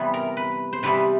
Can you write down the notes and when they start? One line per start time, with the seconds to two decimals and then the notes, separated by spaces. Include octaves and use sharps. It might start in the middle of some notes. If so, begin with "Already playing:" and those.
Already playing: C3 E3 G3 B3
0.14 A#4
0.37 B4
0.73 C5
0.83 C3 E3 G3 B3 B4